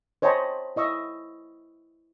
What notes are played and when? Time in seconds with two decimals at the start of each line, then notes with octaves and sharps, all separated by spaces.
0.22 C5 C#5 D#5 G5 A5 B5
0.76 E4 D#5 C#6 E6